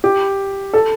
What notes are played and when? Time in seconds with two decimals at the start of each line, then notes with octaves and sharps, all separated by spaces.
0.04 G4
0.74 A4